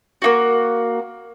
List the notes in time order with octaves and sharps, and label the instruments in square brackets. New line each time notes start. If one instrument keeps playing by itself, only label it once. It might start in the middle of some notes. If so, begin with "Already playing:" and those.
[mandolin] A#3 D#4 F#4